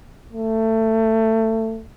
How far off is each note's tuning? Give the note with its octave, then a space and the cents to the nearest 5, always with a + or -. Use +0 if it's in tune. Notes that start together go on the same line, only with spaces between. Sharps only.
A3 +20